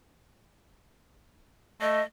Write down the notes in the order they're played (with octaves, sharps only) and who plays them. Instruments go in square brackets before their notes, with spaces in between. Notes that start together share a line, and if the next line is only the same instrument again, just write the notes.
[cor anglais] A3 [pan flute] D#5